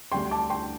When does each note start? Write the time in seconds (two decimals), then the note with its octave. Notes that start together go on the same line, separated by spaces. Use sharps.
0.12 D2 D3 G3 G5 C6
0.31 A5 D6
0.50 G5 C6